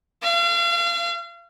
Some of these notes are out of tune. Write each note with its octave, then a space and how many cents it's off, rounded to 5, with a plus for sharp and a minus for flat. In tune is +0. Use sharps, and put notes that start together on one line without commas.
F5 -35